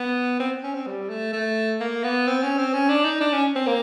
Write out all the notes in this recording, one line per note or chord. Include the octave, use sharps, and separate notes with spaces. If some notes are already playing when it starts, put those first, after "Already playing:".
Already playing: B3
C4
C#4
C4
G3
A3
A3
A#3
B3
C4
C#4
C4
C#4
D4
D#4
D4
C#4
C4
A#3